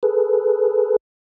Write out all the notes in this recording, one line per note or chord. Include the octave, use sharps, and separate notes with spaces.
G#4 A4 B4